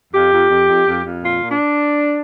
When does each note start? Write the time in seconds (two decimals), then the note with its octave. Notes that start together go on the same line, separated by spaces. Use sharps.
0.13 F2 G4
0.33 F2
0.50 F2
0.69 F2
0.87 F2
1.04 F2
1.23 A#2 F4
1.42 A#2
1.50 D4